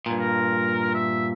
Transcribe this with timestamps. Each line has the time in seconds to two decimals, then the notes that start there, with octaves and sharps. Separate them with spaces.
0.06 G2 A#2
0.20 A#4
0.94 E5